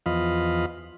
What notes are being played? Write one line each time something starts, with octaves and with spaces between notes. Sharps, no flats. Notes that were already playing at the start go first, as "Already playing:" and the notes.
E2 F3 F4 D#5 F5 B5